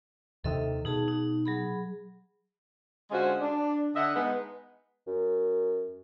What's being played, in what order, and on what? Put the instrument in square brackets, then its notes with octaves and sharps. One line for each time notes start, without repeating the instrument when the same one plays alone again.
[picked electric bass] D#2 C3 D#3 [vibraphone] A4 D#5 E5
[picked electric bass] B2 [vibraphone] D#4 G#4 A5
[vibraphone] D#4
F#3 G#4 B5
[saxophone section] D3 G#3 C#4 F4 F#4 C5
D4
D3 D#5 E5 F#5
G#3 B3 D#4
[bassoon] F#2